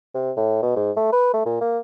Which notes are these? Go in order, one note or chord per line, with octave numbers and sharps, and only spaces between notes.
C3
A2
B2
G#2
A3
B4
A3
A#2
A#3